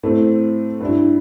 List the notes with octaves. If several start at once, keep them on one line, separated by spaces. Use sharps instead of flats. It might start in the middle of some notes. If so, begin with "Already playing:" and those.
A2 A3 C4
G2 G3 E4